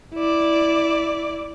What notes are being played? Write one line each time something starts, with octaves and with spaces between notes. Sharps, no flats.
E4 D5